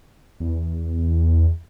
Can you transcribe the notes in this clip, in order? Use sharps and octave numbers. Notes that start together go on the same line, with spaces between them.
E2